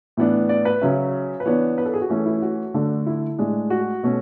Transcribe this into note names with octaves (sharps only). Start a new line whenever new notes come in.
A2 E3 B3 D4
D5
B4
C#3 F#3 C#4 E5
B4
E3 B3 D4 C#5
B4
A4
G#4
F#4
E3 A3 C#4
E4
F#4
D3 A3 D4
E4
A2 G#3 D4
F#4
B2 A3 C#4